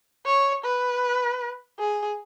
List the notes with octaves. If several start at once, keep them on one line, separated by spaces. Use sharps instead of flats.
C#5
B4
G#4